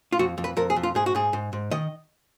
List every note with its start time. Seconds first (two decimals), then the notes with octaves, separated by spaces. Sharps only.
0.12 F4
0.19 F2 F#4
0.38 F2
0.44 B4
0.57 F2 A#4
0.70 G#4
0.76 F2
0.83 F4
0.95 G#2 G#4
1.06 F#4
1.15 G#2 G#4
1.33 G#2
1.53 G#2
1.71 D#3 D#5